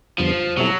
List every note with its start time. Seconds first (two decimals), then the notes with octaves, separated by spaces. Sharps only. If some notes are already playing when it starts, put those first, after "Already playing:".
0.18 F2 D3 F3 G3 B3
0.57 B2 F#3 G3 C4 E4 A4